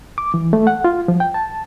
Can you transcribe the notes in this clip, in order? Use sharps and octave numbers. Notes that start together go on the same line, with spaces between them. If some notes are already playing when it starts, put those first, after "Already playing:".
D6
E3
A3
F#5
F4
F3
G5
A5